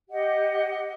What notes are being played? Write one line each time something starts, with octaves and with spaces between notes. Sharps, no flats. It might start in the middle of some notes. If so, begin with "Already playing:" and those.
G4 D#5 F#5